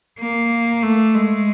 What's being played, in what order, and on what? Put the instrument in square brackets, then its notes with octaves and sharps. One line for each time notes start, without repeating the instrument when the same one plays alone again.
[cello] A#3
A3
G#3